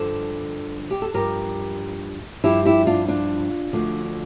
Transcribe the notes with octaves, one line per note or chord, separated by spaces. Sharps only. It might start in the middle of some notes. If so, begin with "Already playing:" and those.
Already playing: G2 D3 F3 A4 C5
G4
A4
G2 F3 G4 A#4
G2 F3 E4 G4
E4 G4
D4 F4
D4 F4
D2 D3 F3